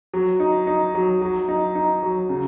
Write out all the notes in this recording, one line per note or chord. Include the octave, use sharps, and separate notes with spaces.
F#3
D#4
D#4
F#3
F#3
D#4
D#4
F#3
C#3